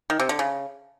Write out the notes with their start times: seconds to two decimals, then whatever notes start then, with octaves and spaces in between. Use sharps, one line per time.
0.10 D#3
0.20 C3
0.29 D3
0.39 C#3